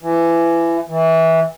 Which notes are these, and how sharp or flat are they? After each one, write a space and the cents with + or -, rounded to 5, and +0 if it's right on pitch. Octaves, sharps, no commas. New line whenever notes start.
E3 +25
E3 -20